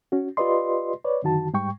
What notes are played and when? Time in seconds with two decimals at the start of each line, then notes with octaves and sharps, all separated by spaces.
0.12 C#4 F#4
0.37 F4 G4 B4 D5 D#5 C6
1.04 B4 C#5 D5
1.22 F#2 D3 D#3 F#4 A5
1.54 G#2 G3 G5 C#6